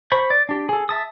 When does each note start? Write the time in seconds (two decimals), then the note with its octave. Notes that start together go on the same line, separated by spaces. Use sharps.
0.12 C5 B5 C#6
0.30 D5
0.49 D4 G4
0.69 G#4 A4
0.89 E5 A5 D#6